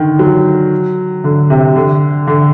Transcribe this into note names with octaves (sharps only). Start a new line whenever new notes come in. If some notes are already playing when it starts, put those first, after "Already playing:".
Already playing: D3 D#3
F#3
D3
C3
D3
D3